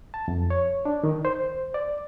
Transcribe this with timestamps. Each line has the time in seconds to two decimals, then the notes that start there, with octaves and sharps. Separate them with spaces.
0.14 A5
0.28 F2
0.50 C#5
0.85 D4
1.04 D#3
1.25 C5
1.74 D5